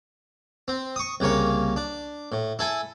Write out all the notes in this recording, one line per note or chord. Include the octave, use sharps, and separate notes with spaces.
C4
C#6 D#6
C2 C#3 A#3 C#5
D4
A2
E4 A4 G#5